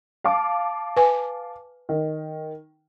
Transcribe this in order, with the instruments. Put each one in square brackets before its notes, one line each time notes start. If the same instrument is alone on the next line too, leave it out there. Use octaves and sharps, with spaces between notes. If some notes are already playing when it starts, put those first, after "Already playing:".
[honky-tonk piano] F5 A5 D6
[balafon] B4 G#5
[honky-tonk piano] D#3